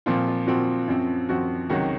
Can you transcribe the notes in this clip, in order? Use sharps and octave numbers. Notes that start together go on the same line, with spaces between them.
A#2 F3 C4 F4
F4
A#2 F3 C4 F#4
F#2 F3 C4
F#2 F3 C4 F#4
C#2 C3 D#3 F#3 F#4